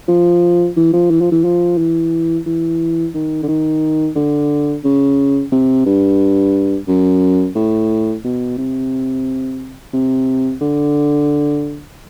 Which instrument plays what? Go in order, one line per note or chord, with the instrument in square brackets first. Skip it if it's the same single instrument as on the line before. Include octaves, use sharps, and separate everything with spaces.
[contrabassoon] F3
E3
F3
E3
F3
E3
F3
E3
E3
D#3
D3
D#3
D3
C#3
C3
G2
F#2
A2
B2
C3
C3
D3